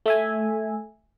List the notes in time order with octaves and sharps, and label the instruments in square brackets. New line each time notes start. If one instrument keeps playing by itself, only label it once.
[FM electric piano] A3 E5 G#5